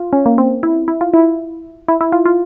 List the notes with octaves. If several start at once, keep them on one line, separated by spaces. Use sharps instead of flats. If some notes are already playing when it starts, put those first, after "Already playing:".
Already playing: F4
C#4
A#3
C4
E4
E4
F4
E4
E4
E4
F4
F4